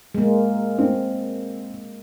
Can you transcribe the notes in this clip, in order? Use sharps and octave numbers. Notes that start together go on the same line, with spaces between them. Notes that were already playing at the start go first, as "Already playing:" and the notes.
G#3 A#3
C4